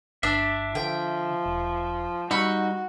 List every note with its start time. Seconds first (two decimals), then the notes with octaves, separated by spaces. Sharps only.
0.23 G1 D4 E5
0.75 D3 F3 G5
1.46 E1
2.31 G3 D#4 F#4 B5 C#6 E6